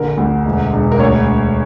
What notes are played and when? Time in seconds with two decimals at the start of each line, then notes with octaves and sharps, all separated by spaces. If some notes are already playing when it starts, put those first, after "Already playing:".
Already playing: A#1 D3 A#4
0.17 D2
0.45 E1
0.73 E1
0.92 A#4
0.99 D2 C#5